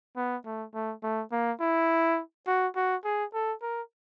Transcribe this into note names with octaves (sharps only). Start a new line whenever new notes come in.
B3
A3
A3
A3
A#3
E4
F#4
F#4
G#4
A4
A#4